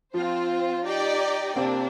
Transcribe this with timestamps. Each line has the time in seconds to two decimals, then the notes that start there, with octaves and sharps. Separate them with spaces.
0.14 F3 C4 F4 C5
0.85 D#4 G4 D5 G5
1.55 C3 A#3 C4 D4